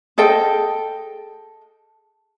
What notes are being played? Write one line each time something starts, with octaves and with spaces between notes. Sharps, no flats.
G#4 A4 D#5 G5